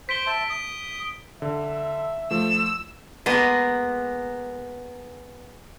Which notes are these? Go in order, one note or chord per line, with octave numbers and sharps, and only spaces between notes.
C5 B6 D7 G7
E5 A5
D#6
D3 E5
F3 A3 E6
G#3 A#3 B3